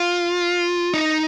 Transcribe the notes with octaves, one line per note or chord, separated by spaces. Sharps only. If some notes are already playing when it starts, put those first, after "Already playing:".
Already playing: F4
D#4